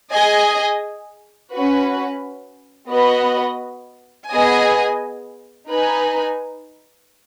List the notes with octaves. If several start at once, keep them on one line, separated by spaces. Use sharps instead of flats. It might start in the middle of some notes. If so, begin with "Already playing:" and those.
G#4 D#5 G#5
C#4 F#4 B4
B3 F#4 B4 D#5
B3 G#4 D#5 G#5
D#4 B4 G#5